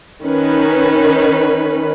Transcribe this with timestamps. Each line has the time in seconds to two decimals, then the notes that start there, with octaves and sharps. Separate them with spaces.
0.22 D#3 C#4 B4